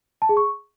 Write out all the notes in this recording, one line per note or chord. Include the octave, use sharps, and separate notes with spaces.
A5
G#4
C#6